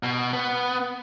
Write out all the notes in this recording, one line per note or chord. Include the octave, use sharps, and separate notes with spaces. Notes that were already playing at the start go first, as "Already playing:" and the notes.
B2
B3